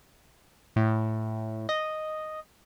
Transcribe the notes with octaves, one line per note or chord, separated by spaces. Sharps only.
A2
D#5